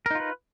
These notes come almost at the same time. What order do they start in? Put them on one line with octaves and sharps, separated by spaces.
A#4 D#4 F4 B4